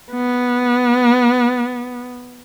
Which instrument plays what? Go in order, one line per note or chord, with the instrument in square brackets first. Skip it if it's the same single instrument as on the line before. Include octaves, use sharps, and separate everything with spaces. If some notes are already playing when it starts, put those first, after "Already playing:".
[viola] B3